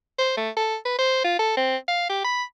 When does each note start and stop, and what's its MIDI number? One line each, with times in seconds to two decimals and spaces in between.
0.19 0.37 72
0.37 0.50 57
0.57 0.76 69
0.85 0.96 71
0.98 1.24 72
1.24 1.36 65
1.39 1.57 69
1.57 1.76 60
1.88 2.07 77
2.09 2.20 67
2.25 2.43 83